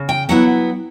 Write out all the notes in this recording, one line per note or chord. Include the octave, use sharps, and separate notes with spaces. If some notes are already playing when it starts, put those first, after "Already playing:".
Already playing: C#3
G5
F#3 B3 E4 F#5